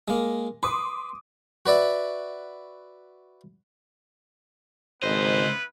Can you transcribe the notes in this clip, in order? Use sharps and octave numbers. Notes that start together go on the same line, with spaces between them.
G#3 A#3
B4 C6 D6 D#6
F#4 B4 D5 E5
G#1 C#2 B3 E4 B4 C5 D#5